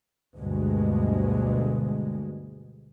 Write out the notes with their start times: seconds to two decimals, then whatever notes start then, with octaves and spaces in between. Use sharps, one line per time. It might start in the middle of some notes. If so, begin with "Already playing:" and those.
0.37 D2 G2 B2 G#3